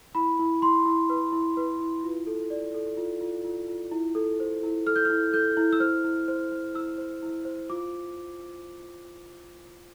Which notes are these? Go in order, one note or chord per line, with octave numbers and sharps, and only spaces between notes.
E4 B5
E4
E4 C6
E4
B4
E4
B4
E4
F4
A4
D5
A4
F4
F4
F4
F4
E4
A4
C5
E4
A4 F6
G6
F6
E4
A4 G6
E4
E6
C5 F6
E4
C5
C5
E4 E6
C5
E4
C5
F4 D6